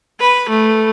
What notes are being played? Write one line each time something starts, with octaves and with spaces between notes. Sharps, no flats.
B4
A3